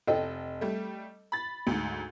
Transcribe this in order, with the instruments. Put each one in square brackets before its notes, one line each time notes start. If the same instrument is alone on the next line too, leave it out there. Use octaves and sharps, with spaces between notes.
[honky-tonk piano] F1 [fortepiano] A4 D#5 G5
[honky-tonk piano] G3 A3
B5 A6
D2 G#2